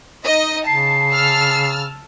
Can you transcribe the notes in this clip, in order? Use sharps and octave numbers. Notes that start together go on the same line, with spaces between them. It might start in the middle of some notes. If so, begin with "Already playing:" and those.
D#4 D#5
C#3 A5 C7
A5 E6 F6